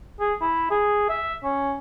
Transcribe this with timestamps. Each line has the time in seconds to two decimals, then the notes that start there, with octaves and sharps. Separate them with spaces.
0.20 G#4
0.41 E4
0.71 G#4
1.09 E5
1.44 C#4